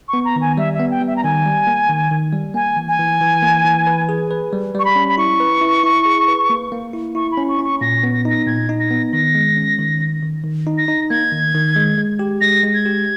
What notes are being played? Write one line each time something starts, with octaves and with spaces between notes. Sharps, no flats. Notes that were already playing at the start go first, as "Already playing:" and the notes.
C#6
B3
A#5
D#3
G#5
G3 E5
E5
B3
G5
G3
E5
A#5
D#3 G#5
G3
A#3
D#3
D#3
G3
A#3 G#5
E3
G#5
E3
E3
A#3
E3
B4
G#4
B4
G3
G3 C#6
B5
C#4
B5
E4 C#6
B4
E4
E4
G#4
B4
A#3
A#3
E4
E4 C#6
B5
C#4
C#6
C#4
C#6
A#2 A#6
B3
A#6
D#4 A#6
A#2 G#6
D#4
A#6
B3
D#3 A#6
G#3
C#4
D#3
D#3
D#3
D#3
D#4
A#6
D#4
A#3 G#6
D#3
D#3
G#3
G#3
G4
G#3 A#6
G#3
G#6
G4